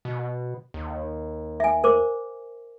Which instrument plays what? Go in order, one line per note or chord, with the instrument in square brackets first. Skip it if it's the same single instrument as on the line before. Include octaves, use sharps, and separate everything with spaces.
[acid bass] B2
D#2
[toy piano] E5 G#5
A#4 C5 D6